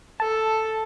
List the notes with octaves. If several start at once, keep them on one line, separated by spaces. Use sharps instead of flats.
A4 A5